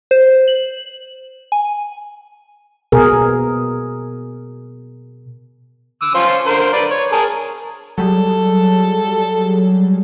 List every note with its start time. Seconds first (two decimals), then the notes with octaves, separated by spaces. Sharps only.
0.11 C5
0.48 F#7
1.52 G#5
2.92 B2 G#4 A#4
6.02 D6 E6
6.15 C#4 F4 C5
6.46 D3 A#4 C5
6.73 B4 D5
6.91 C#5
7.12 G#4 A#4 A5
7.98 F#3 G3 G#4 A4